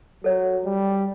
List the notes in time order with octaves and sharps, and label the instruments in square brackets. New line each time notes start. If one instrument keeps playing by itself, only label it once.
[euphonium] F#3 [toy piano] A4 C#5
[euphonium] G3